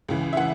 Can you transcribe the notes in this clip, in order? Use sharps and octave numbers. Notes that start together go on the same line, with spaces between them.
C#2 C#3 E3
E5
E3 F#5